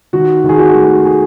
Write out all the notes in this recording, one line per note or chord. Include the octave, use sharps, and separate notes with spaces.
D#3 F#4
D#3
G#4
F#4
A3
G#4